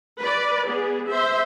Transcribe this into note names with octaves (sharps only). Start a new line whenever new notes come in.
B4 D5
B3 G#4
C5 E5